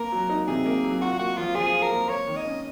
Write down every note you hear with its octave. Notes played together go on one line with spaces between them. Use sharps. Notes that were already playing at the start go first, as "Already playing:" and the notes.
Already playing: A#3 A#4
F#3
D#4
C3 G#4
A#3
F#3
F4 F#4
A#3 F#4
F3 F4
F3 G#4
F4
A#4
A#3
A#3 C#5
D#3
D#5
C#4